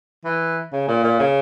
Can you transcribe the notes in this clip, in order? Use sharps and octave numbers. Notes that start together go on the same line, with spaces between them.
E3
C#3
A#2
A#2
C#3